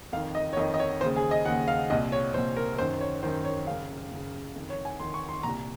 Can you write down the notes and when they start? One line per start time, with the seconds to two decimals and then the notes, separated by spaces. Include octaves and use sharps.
0.12 F2 F5
0.16 D#3
0.35 D#5
0.53 C#5
0.57 F2 D#3 D#5
0.74 D#5
0.79 C#5
1.01 D#2 C#3 C5
1.16 G#4
1.31 D#5
1.45 D#2 C#3 F#5
1.68 F5
1.90 C2 A#2 D#5
2.12 C#5
2.34 C2 C5
2.37 A#2
2.57 A#4
2.79 F#2 D#3 C5
3.00 C#5
3.23 F#2 D#3 C5
3.45 C#5
3.67 F#2 C#3 F5
4.12 F#2 C#3
4.55 F2 D#3
4.70 C#5
4.85 G#5
5.00 F2 D#3 C6
5.14 C#6
5.29 C6
5.43 C2 A#2 A#5